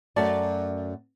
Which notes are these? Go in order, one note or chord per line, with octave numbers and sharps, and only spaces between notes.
F#2 A3 C#4 F#4 D5 A5